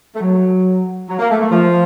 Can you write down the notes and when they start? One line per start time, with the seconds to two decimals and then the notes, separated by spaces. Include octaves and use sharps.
0.15 A3
0.21 F#3
1.09 F#3
1.19 A#3
1.30 A3
1.41 A3
1.51 F3